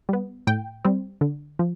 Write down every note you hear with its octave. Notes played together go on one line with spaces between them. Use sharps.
G3 B3
A2 G5
G3 C4
D3
F3